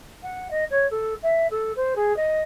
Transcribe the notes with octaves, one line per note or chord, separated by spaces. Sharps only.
F#5
D#5
C#5
A4
E5
A4
C5
G#4
D#5